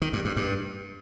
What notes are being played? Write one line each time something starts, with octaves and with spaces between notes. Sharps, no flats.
D#3
G2
G2
G2